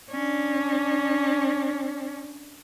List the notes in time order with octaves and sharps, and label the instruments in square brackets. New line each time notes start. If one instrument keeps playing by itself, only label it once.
[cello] C#4 D4